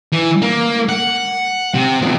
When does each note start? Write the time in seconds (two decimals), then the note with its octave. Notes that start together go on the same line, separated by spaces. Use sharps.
0.12 E3
0.42 A#3
0.89 F#5
1.74 C3
2.02 F2 B2